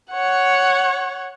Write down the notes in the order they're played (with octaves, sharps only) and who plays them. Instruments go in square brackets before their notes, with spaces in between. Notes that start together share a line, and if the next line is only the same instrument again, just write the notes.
[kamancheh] C#5 F#5